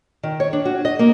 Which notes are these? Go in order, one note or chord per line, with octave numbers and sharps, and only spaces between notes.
D#3
C#5
D4
F#4
D#5
A#3